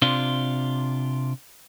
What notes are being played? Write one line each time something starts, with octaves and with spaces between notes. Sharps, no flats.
C3 D4 F4